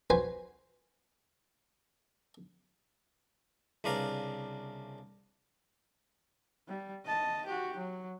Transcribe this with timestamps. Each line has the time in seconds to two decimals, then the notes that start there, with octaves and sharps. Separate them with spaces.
0.10 F#4 B4 C5 G#5
3.84 C2 C#3 D4 B4 F5 A#5
6.68 G3
7.05 D#5 A5
7.46 F#4 G4
7.77 F#3